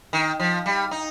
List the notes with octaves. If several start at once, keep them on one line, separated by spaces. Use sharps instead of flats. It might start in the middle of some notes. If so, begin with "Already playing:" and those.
D#3
F3
G3
D#4